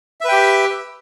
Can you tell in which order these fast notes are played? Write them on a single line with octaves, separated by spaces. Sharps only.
E5 B4 G5 G4